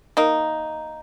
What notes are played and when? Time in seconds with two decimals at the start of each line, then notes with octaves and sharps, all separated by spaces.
0.17 A#3 D#4